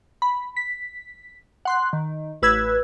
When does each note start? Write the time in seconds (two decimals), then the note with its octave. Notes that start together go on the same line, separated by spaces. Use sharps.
0.22 B5
0.57 B6
1.65 F#5 C6 F#6
1.93 D#3
2.42 A1 B4 E6 F#6 G#6